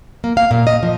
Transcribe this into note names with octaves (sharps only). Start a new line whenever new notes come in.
A#3
F5
A#2
D#5
F3